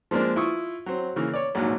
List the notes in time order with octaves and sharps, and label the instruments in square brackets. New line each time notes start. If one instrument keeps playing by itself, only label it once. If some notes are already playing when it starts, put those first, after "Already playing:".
[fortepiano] F3 G#3 A#3 C4 D4
E4 F4 C#6 D#6 E6
F#3 C4
C#3 E3 A#3
C#5 D5
A#1 D#2 G#2 F#3